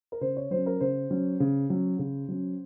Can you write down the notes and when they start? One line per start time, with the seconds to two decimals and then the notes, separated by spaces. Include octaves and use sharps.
0.12 A#4
0.21 C#3 C5
0.37 C#5
0.51 F#3 C#4 C5
0.66 A#4
0.80 C#3 C5
1.10 F#3 C#4
1.40 C#3
1.70 F#3 C#4
1.99 C#3
2.28 F#3 C#4